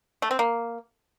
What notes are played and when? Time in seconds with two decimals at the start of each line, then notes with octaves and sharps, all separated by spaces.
0.22 A3
0.31 C4
0.39 A#3